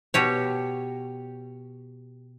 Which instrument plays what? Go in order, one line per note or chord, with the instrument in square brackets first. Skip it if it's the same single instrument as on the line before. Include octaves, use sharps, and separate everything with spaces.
[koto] B2 G4 C#5